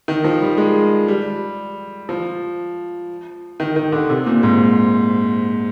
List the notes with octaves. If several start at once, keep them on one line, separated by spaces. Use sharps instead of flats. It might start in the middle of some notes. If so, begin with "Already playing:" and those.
D#3
F3
G3
G#3
G3
F3
D#3
D#3
D3
C3
A#2
G#2